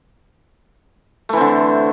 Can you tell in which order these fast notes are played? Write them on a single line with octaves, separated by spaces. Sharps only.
A3 E3 C4 D3